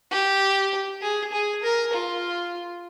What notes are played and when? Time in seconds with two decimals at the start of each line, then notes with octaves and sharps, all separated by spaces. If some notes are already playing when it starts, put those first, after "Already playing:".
0.11 G4
1.02 G#4
1.32 G#4
1.63 A#4
1.93 F4